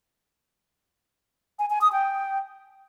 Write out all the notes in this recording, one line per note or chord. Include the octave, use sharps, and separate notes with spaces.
G#5
G#5
D#6
G5